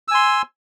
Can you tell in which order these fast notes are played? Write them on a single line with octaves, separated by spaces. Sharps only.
E6 G#5 C6